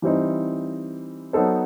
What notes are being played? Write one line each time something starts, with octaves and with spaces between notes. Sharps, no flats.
E3 G3 C4 D#4
F#3 B3 D#4 A4 C5